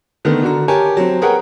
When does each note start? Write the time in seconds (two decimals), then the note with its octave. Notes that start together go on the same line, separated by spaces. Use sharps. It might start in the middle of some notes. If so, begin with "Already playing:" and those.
0.25 D3 D#3 A3 B3
0.42 D3 F#4 A#5
0.68 G4 A#4 C#5 G#5 A5
0.97 F#3 C4
1.22 G#4 A#4 B4 C#5 F#5 G5